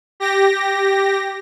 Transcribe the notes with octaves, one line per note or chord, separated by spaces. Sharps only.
G4 A#6